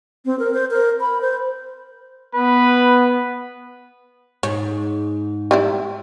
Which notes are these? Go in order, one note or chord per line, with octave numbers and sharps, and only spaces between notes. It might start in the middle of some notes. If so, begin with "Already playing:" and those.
C4
A#4
C5
A#4
B5
C5
B3 B4
G#2 C#5
G3 C4 E4